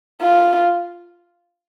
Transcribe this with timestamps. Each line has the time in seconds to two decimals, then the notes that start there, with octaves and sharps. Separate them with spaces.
0.21 F4